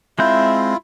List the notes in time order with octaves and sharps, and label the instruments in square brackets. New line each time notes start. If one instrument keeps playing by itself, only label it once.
[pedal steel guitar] G#3 C4 G6 [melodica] E4 F4 [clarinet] E5